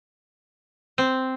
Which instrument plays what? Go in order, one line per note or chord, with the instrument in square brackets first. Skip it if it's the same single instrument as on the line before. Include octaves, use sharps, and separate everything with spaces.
[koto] C4